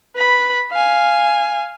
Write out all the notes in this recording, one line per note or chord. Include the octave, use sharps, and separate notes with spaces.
B4 B5
F5 G#5